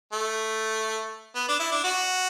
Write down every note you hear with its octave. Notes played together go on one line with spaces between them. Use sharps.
A3
B3
D4
E4
D4
F#4